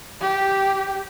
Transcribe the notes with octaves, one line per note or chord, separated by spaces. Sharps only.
G4